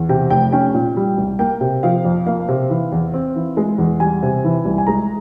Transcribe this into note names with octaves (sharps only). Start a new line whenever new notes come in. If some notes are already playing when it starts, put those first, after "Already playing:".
Already playing: E2
C3 G5
F1 G5
C#4 G5
A#2
G3
C2
A#3 G5
C3
F3 F5
F2
A#3 F5
C3
E3
E2
C4
E3
G#3
E2
G3 G#5
C3
E3
C2
G#5
G#3 A#5